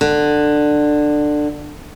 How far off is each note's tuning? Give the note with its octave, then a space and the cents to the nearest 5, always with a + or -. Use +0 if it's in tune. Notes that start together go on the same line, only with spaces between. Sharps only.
D3 +15